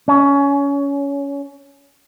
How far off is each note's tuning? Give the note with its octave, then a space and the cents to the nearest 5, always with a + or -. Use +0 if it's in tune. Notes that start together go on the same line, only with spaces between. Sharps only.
C#4 +20